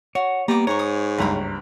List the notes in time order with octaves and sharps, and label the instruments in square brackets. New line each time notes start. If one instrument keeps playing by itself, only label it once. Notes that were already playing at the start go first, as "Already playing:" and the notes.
[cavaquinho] F#4 [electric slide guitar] C#5
[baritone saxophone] G3 [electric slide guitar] A#3 B3 [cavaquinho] A#5 D6
[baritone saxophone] G#2 [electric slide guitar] C#5 [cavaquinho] A#5 C#6
[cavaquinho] D#6
[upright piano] F#1 C#2 G2 [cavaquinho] B4 A#5 B5